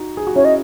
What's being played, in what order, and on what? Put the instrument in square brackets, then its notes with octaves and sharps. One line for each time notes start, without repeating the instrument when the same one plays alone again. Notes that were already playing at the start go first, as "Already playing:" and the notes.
Already playing: [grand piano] D#4 F#4
G#4
F#4
[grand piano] C#4 E4 [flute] C#5
[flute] D#5